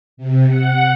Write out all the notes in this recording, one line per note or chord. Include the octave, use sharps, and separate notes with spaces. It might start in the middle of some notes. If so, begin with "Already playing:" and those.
C3
F#5